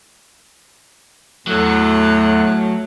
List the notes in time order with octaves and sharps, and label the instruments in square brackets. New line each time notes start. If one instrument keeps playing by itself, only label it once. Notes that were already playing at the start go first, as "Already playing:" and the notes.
[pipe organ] E2 F#6 [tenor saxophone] A2 [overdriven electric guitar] F#3 [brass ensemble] A3